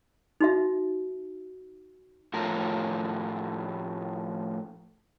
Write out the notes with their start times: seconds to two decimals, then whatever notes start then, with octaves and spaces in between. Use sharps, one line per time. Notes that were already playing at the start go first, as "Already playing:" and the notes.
0.41 D#4 F#4 E5
2.34 A2 F3 A#4